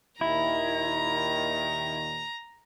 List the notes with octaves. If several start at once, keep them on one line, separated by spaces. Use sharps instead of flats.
D#2 A#2 D#3 E4 A#5